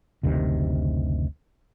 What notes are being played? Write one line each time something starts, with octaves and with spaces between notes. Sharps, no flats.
F#1 D2 C3 D#3